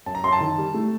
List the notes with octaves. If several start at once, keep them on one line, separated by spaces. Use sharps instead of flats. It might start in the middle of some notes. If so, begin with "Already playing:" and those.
F#2 A5
A#5
F#2 C6
A5
D#3
G3
A3